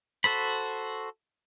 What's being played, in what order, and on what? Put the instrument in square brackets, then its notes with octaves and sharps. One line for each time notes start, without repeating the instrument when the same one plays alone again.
[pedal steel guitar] F#4 A4 C5 B5